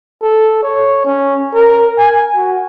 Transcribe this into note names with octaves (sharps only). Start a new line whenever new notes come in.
A4
C#5
C#4
A#4
G#5
F#4